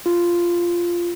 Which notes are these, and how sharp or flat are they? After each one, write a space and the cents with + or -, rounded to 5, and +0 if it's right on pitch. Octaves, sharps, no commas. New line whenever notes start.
F4 -10